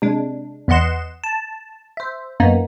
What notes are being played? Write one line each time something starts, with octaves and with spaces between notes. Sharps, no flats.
C3 G#3 D4
E2 B3 D#5 F#5 C6 E7
A5
C5 E5
F#2 A#3 B3 D#4